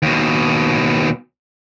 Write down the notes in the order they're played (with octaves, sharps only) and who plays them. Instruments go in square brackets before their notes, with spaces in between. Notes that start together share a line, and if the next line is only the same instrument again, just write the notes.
[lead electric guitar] D#2 B2